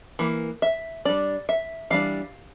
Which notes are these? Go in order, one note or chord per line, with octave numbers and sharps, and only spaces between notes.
E3 A#3
E5
G3 D4 D5
E5
E3 G3 D4 F5